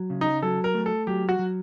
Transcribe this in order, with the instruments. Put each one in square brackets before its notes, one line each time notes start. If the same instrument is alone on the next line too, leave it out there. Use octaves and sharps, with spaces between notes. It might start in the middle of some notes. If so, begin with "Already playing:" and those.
Already playing: [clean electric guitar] F#3
C#3
[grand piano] D#4
[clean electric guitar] F#3 [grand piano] A4
[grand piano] A#4
[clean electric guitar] A3
[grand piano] A4
[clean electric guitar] F#3 [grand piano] G4
[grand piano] F#4
[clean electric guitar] F#3